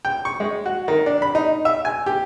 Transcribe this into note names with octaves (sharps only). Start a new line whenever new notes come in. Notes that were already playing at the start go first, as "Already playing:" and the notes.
G5
C#6
G#3
F#4
D#3
D4
B5
D#4
E5
G#5
G4